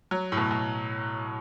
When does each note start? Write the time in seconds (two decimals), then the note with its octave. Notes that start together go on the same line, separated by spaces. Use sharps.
0.11 F#3
0.32 A2
0.37 B2
0.51 B2